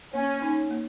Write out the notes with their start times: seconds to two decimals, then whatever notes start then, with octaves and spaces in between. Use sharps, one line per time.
0.14 A#3 C#4
0.42 D#4
0.71 A#3